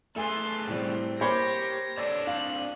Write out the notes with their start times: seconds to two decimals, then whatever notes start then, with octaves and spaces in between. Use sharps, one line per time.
0.16 A3 G#4 A4 B4 G#5 A5 C6
0.67 A2 G3 C4
1.21 A#3 G4 C5 C#5 B5 A#6
1.97 D4 A4 C#5 D5
2.27 C4 D4 F5 F#6